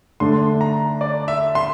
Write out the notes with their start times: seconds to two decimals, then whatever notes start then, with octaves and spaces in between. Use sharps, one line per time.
0.20 D3 A3 D4 C6
0.61 A#5
1.01 D5
1.28 E5
1.55 C6